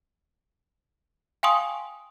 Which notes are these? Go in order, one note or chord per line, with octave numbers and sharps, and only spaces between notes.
F5 G5 G#5 C6 C#6 D#6